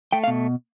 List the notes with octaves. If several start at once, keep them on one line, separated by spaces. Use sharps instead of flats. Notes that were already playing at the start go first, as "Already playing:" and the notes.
A3 G5
F5
B2